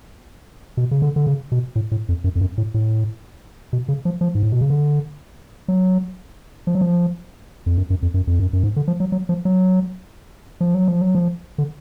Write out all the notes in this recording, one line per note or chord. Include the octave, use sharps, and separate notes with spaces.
B2
C#3
D3
D3
C#3
B2
A2
A2
F2
F#2
F2
F#2
A2
A2
B2
C#3
F3
F3
G#2
A2
B2
C#3
D3
F#3
F3
F#3
F3
F2
F#2
F#2
F2
F#2
F2
F#2
F#2
G#2
D3
F3
F#3
F#3
F3
F#3
F3
F#3
F3
F#3
F3
D3